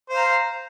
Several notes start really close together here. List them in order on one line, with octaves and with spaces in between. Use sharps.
C5 F5 A#5